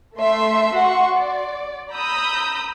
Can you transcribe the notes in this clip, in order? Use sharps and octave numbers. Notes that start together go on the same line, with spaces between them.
A3 E5 C6
F#4 F#5 C6 C#6
D5
A#5 B5 D#6 E6 G6